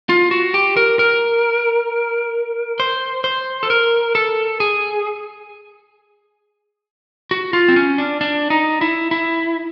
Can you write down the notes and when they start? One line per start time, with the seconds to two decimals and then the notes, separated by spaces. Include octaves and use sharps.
0.09 F4
0.31 F#4
0.54 G4
0.77 A#4
0.99 A#4
2.80 C5
3.24 C5
3.63 A4
3.70 A#4
4.15 A4
4.60 G#4
7.31 F#4
7.53 F4
7.68 C4
7.76 C#4
7.98 D4
8.21 D4
8.50 D#4
8.81 E4
9.11 E4